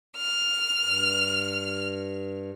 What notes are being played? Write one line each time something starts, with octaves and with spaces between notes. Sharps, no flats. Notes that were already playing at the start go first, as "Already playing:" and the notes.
F6
G2